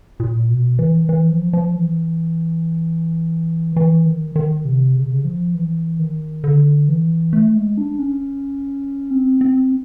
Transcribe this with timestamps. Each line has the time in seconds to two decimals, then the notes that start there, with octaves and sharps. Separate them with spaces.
0.20 A#2
0.49 B2
0.79 E3
1.09 E3
1.31 F3
1.53 F3
1.76 E3
3.76 E3
4.06 D#3
4.36 D#3
4.65 C3
4.95 C#3
5.03 C3
5.10 C#3
5.25 F3
5.54 E3
5.99 D#3
6.44 D3
6.89 E3
7.33 A3
7.55 G#3
7.78 D4
7.99 C#4
9.11 C4
9.41 C4